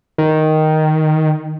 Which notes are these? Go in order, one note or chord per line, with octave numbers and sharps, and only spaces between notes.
D#3